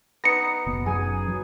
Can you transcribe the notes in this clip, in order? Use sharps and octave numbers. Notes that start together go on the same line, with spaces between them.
B3 D#4 A#6 C#7
F#1 B2
F#2 G#4 G#5
F#3